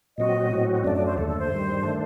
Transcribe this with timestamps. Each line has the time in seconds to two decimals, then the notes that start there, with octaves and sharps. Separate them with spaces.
0.18 A#2 F#3 C4 F#4 D#5
0.51 A2 F#3 C4 F#4
0.84 F#2 F#3 A3 D4 D5
0.95 D5
1.06 C5
1.17 D#2 D3 A3 A4
1.28 A4
1.39 C5
1.51 G2 D#3 G3
1.83 D#3 A3 D4